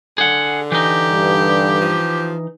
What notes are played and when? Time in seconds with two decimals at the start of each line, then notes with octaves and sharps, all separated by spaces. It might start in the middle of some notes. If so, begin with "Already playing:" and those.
0.18 D3 G#4 F#5
0.72 E3 D#4 G4
1.11 G2
1.80 F3